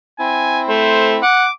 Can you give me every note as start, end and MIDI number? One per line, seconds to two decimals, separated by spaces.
0.19 1.23 60
0.19 1.23 64
0.19 0.62 80
0.69 1.16 57
0.69 1.14 72
1.23 1.45 78
1.23 1.52 86